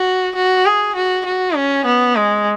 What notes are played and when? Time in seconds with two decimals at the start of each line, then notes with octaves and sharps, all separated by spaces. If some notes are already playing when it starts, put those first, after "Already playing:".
Already playing: F#4
0.35 F#4
0.65 G#4
0.95 F#4
1.25 F#4
1.56 C#4
1.85 B3
2.16 G#3